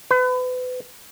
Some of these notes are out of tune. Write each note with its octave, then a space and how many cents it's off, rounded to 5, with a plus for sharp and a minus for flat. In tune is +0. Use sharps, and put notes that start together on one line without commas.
B4 +35